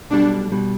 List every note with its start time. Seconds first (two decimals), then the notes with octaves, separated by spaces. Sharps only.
0.10 B1 B2 G3 D4
0.52 B2 G3